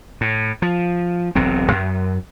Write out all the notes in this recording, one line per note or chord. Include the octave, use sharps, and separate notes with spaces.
A2
F3
E1 B1 C3 C4
F#2